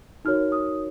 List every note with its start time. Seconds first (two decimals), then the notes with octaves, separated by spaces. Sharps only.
0.25 D#4 F#4 A#4 C#5 F6
0.52 D#6